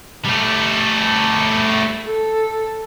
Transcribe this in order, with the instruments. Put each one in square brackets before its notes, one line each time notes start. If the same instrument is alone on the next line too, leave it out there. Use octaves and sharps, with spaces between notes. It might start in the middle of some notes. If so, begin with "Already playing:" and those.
[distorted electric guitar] G3 A3
[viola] A4